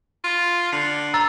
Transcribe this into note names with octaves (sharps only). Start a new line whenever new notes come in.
F4
D3 C7
A#5 E6 A6